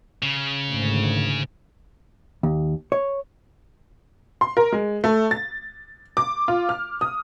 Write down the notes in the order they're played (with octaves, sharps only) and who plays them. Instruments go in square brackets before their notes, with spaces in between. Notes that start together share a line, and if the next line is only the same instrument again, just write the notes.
[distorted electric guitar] C#3
[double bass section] G#1 D2
[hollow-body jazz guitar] D#2
C#5
[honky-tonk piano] C6
A#4
G#3
A3
A6
D6
F4
F6
D#6